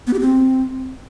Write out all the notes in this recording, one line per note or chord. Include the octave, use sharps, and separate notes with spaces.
B3
G4
C4